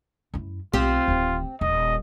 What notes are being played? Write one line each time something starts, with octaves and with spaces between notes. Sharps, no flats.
F#2 E4
B1 C4 F4 G4
D1 D#3
D#1 D#5